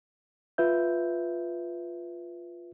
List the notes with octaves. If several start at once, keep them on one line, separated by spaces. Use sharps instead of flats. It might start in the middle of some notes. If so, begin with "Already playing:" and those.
F4 B4 E5 G6